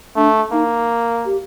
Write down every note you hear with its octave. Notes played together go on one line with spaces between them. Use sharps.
A3 D4
A#3 D#4
G4